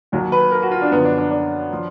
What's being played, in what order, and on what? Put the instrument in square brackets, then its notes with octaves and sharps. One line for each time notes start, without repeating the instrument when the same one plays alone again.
[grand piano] D#2 D#3 F#3
B4
A#4
F#4
F4
D4
F#2 D3 F3 B3
D4
D4
D4
F3